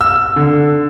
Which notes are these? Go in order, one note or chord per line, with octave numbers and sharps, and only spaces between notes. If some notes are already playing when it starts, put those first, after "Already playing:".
E6
D3